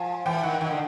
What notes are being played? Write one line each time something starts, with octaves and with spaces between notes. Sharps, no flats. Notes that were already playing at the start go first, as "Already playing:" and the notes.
Already playing: F3 G#5 A5
E3 G5
D#3 F#5
D#3 G5
D3